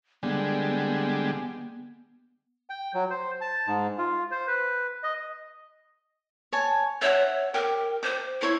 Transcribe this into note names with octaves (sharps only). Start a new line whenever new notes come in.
D3 G3 G#3 B3
G5
F#3
C5
A5
G#2
F4
C5
B4
D#5
C#5 G#5 A5
C#5 E5 F#5
G4 A#4 G5
C5 D6
E4 C5 C#5 E5